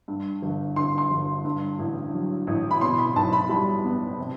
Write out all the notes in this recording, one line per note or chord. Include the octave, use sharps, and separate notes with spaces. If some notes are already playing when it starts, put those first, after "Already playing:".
G2
G1
D3 C6
C6
G1
G2
A1
F#3
A1
B5
B2 C6
B5
B1 A5
B5
G3 B5
B3
C3